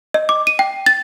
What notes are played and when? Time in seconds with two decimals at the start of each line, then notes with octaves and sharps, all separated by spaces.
0.14 D#5
0.29 D6
0.47 D#7
0.59 G5
0.86 A6